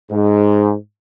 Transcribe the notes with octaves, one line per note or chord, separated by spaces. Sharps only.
G#2